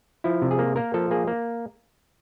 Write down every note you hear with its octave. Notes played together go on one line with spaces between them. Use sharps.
F3 E4
C3
G#4
A#3
A#3 A#4
F3 A4
A#3 G#4
A#3